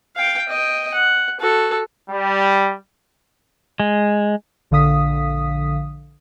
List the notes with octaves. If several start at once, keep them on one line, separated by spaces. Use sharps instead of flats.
F5 G5
D#5 G5
F#5
F#4 A4
G3
G#3
A#1 D3 F5 D#6 B6